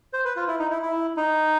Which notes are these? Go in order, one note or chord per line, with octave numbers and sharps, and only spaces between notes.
C5
B4
F4
E4
D#4
E4
E4
D#4